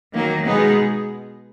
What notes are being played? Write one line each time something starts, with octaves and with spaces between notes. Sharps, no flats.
D#3 F#3 A#3
B2 G#3 B3 D#4 G#4